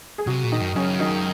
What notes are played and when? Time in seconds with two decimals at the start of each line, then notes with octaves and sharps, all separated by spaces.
0.18 G#4
0.27 C3 F#3 F#4
0.43 A#2
0.52 D#3 D#4
0.60 F#2
0.76 F#2 C#3 C#4
0.99 D#3 D#4